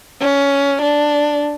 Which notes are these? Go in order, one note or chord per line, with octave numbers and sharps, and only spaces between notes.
C#4
D4